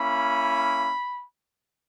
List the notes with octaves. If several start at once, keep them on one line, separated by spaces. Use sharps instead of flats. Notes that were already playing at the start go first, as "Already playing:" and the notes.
Already playing: A#3 C#4 E4 B5